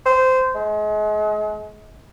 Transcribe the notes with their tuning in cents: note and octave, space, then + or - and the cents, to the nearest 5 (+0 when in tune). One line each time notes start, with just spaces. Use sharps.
C5 -15
G#3 +35